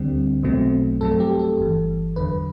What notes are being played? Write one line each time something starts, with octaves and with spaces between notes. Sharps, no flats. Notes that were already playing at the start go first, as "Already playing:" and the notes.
Already playing: D2 D3 G3 C4
B1 B2 F#3 A3 C4
G2 F#3 A3 C4 A4
G4
A4
G1 G2 E3
E2 D3 F#3 B4